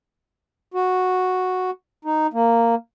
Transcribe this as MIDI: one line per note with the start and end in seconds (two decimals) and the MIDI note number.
0.74 1.70 66
2.05 2.27 63
2.33 2.75 58